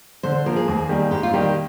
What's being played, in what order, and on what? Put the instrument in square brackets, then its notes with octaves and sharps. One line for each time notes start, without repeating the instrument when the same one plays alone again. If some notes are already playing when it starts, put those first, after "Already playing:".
[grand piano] D3 [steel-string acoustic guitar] C5
[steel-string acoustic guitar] C5
[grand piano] F3 A#3 [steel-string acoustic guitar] A#4
[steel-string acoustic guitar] G#4
[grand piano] D#2
D#3 G3 A#3
[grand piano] G#2 [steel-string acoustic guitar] G4
[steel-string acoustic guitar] F4
[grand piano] D#3 G3 A#3 [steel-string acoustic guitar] G4